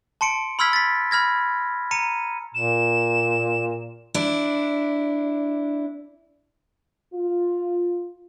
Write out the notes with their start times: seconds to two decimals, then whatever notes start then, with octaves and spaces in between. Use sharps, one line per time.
0.21 A5 C6 C#7 D7
0.59 B5 C6 E6 F6 G#6 B6
0.73 A6 B6
1.11 B5 F6 G#6 A#6
1.91 A#5 C#7 D#7
2.55 A#2 E7
4.14 D4 E4
7.14 F4